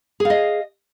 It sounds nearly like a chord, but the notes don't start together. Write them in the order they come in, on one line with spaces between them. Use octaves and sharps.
G#4 F5 D#5